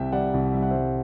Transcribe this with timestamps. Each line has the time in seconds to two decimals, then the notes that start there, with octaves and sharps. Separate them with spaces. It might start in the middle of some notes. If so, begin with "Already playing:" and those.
Already playing: C2 C3 E5 G5
0.12 G3 D5 F#5
0.34 C2
0.54 G3 E5
0.62 F#5
0.71 C5 E5
0.74 G3